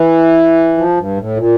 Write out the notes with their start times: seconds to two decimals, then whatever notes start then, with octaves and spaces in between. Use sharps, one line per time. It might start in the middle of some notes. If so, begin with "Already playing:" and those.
Already playing: E3
0.77 F3
0.97 G2
1.17 A2
1.37 A#2